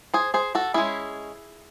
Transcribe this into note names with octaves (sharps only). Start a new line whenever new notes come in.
G#4 C5
G#4 C5
F#4 A4
G#3 C#4 E4 G#4